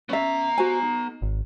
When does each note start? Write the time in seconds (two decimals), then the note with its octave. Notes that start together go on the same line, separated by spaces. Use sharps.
0.10 B3 C#4 E5 A#5
0.58 F#4 C5 G#5
0.82 D#4
1.22 G#1